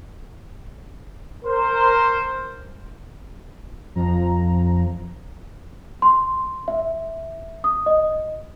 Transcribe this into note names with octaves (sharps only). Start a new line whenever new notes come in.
A#4 C5
F2 F3 A#5
C6
E5
D#6
D#5